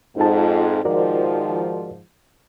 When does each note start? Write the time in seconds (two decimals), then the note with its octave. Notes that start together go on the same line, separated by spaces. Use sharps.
0.16 F2 G#2 D#4 F4 A5
0.85 G#2 D#3 F3 F#4 A#4 D5